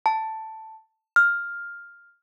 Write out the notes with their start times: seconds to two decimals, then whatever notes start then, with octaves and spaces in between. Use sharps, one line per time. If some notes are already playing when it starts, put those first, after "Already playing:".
0.06 A5
1.16 F6